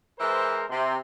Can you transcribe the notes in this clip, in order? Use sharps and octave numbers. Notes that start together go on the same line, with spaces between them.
E3 G#3 A#4 C5
C3 C6